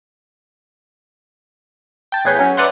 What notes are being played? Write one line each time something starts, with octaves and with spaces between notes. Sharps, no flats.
G5 A5
E2 A2 G#4 B4 C#5 G6
F#3 C#4
B4 D5 E5 F#5 A#5 C6